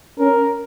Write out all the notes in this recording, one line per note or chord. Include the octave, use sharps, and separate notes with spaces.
C#4 A#4